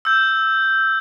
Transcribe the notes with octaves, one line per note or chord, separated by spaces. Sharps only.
E6 G6